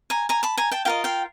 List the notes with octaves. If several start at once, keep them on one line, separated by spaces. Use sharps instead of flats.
G#5 A#5
G#5 A#5
A5 B5
G#5 A#5
G5 A5
F4 A#4 D#5 F5 G5
F5 G5